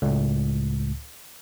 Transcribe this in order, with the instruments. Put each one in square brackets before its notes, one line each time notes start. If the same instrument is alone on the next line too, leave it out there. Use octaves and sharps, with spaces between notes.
[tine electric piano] C#2 A2